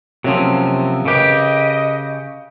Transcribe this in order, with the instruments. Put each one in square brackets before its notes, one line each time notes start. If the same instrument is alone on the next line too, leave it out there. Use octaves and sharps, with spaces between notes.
[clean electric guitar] C3 F3 [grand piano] F#3 A#3 C#4
[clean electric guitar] C#3 G4 [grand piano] A#4 B4 G5 [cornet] D#5